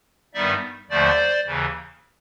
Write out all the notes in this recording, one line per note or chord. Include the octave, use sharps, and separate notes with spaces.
G2 D#3 G3 B3 D#4 D5 E5
D#2 D3 F3 A3 C5 D5
D#2 C#3 E3